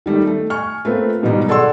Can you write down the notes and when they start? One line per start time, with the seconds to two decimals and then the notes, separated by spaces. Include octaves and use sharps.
0.06 D#3 G3 A3
0.27 A3
0.50 G#5 C#6 F6
0.85 A3 A#3 C4 F4 B4
1.23 G#2 B2 D#3 F#3 G3 D#4
1.48 G#4 A4 D5 F#5 C6 E6